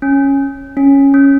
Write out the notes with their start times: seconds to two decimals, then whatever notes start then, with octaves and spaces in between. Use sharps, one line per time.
0.02 C#4
0.77 C#4
1.14 C#4